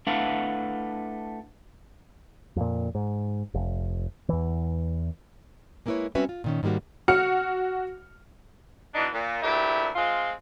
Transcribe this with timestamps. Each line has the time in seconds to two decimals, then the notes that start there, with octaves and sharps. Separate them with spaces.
0.07 A3 D4 E4 B4 F5 F#5
2.56 F2 A#2
2.95 G#2
3.54 F1
4.29 E2 E3
5.86 G#3 A#3 B3 E4 B4 C#5
6.15 G3 C4 C#4 F#4 B4 E5
6.29 F4
6.44 A#2 D#3 C#4
6.63 G#2 D#3 G3 A#3 F#4
7.08 F#4 F6 C#7
8.94 B2 E3 D4 D#4
9.14 A#2
9.42 D2 A#2 E4 G4
9.96 G#3 C4 F4